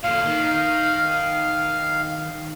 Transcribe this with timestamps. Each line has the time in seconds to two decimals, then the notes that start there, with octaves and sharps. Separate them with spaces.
0.04 A#2 D3 F5
0.25 D#3